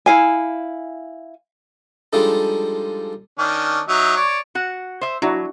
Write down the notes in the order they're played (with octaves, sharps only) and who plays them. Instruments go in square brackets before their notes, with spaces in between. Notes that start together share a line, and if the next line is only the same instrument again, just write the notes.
[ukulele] E4 F5 G#5
[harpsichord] F3 G3 G#3 D4 D#4 A4
[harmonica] D#3 C#4 D4
F#3 D#4 E5
C#5 D5
[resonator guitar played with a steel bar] F#4 F#5
C5 E5
[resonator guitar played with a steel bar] F#3 [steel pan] D4 E4 F#4